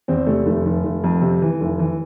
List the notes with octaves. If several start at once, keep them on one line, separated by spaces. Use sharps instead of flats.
E2 C4
C3 A3
F1 A3
F1
F1
F2
C3
E3
F1
E3